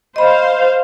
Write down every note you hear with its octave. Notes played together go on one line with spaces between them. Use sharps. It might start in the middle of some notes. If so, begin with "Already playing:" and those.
C5 D#5 F5 B5